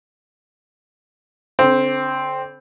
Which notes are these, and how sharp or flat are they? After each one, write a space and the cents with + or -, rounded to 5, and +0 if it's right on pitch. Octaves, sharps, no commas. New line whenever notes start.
D3 -30 C4 +0